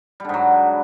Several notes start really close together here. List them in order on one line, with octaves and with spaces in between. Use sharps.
G3 D3 G#2 F#3